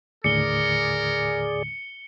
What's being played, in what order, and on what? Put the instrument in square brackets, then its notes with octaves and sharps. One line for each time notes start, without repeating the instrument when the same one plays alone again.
[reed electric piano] D#2 A2 D3 [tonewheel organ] G#4 D5 [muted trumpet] A#4 [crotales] C#7 G7